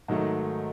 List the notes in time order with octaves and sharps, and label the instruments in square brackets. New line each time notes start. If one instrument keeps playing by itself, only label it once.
[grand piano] G#2 D#3 F#3 A3